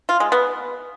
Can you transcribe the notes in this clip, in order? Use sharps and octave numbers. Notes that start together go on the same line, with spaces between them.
F4
G#3
B3